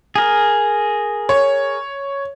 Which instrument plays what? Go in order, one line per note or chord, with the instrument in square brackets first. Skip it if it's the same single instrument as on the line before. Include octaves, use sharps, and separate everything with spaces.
[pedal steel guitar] G#4 A#4
[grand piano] C#5